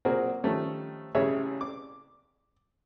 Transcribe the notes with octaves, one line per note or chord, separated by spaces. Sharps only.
A#2 F#3 C4 F#4 G#4 A#4
D#3 F3 G3 A3 C#4
A1 C#3 G3 G#4 C#5 E5
D6